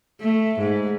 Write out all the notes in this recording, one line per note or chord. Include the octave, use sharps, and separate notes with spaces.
A3
G#2